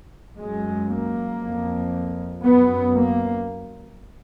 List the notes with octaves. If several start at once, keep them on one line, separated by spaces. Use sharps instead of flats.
F#2 G#3
A#3
F2
F#2 B3
A#3